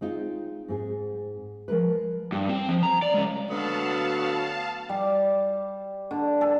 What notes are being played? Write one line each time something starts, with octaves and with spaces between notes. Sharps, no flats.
G#3 C4 D#4 F4
G#2 C4 G#4
F3 G#3 A#4 B4
G2
C4
F3
A#5
D5
G#3 C#4
D2 F#3 B3 F5 A5
G3
D3
A4